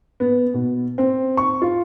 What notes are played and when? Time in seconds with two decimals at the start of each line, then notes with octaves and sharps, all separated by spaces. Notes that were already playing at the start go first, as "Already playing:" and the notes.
0.20 B3
0.54 B2
0.98 C4
1.37 C#6
1.62 F4